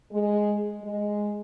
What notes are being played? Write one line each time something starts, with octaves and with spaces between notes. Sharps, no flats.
G#3
G#3